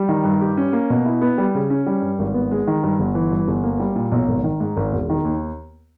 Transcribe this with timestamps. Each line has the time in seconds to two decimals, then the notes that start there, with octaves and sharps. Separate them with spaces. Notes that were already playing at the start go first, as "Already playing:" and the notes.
Already playing: G3
0.09 D#3
0.24 G2
0.41 G4
0.57 C#4
0.73 A#3
0.90 B2
1.06 E4
1.21 B3
1.38 G3
1.55 C#3
1.70 C#4
1.86 G3
2.02 G2
2.19 G#1
2.34 B3
2.51 G#3
2.67 D#3
2.83 G2
2.99 G1
3.15 E3
3.32 G2
3.48 G1
3.64 A#3
3.80 G3
3.96 A#2
4.12 B1
4.28 G#1
4.44 D#3
4.60 G#2
4.77 G#1
4.93 E1
5.10 D#3
5.25 D#2